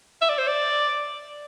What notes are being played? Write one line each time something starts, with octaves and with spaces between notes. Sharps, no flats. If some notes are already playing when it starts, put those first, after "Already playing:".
E5
D5
C5
D5